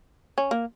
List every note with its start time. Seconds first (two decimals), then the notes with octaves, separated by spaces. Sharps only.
0.38 C#4
0.51 A#3